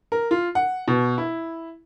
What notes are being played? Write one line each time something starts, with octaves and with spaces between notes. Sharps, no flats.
A#4
F4
F#5
B2
E4